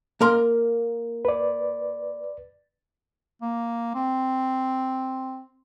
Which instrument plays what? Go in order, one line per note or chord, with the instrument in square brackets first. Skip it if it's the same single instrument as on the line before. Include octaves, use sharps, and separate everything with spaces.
[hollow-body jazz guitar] A#3 A#4 C6
[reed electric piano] B4 D5
[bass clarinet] A#3
C4